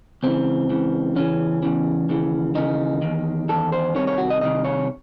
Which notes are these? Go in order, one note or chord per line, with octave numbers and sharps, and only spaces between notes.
C#2 C#3 E3 C4
C#2 C#3 E3
E2 C#3 E3 C#4
E2 C#3 E3
D#2 C#3 E3
D#2 C#3 E3 D#4
E2 D#3
E2 D#3 A4
C5
C2 C3 D#3 C#5
C#5
F#4
D#5
C2 C3 D#3 D#5
C#5